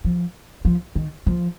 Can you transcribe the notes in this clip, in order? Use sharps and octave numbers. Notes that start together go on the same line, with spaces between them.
F3
F3
D#3
F3